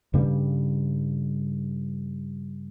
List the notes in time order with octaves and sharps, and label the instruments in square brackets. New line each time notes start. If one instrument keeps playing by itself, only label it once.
[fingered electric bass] G2 C#3 G3